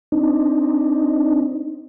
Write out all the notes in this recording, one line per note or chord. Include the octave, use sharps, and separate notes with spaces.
C4 D4 D#4